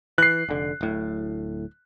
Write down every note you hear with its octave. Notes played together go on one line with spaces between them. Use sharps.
E3 F#6 C7
F1 D3
D1 A2